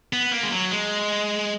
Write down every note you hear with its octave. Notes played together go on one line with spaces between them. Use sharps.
B3
A#3
G#3
F#3
G#3